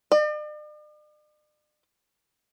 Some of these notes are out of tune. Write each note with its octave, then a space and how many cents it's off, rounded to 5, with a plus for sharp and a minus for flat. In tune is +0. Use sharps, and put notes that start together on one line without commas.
D5 +45